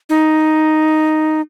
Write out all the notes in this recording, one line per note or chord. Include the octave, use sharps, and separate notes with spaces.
D#4